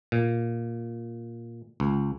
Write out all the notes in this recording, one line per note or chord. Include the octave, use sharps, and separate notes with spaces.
A#2
C#2